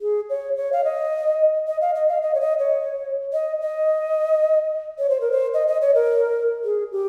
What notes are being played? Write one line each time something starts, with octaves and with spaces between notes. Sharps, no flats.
G#4
C#5
C#5
F5
D#5
D#5
F5
D#5
F5
D#5
C#5
D#5
C#5
D#5
D#5
C#5
C5
A#4
C5
D#5
D#5
C#5
A#4
G#4
G4